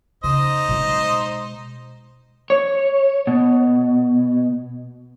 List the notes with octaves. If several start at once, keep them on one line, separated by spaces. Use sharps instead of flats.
C#3 D#4 C5 D#5
B2 G#3
C#5
B2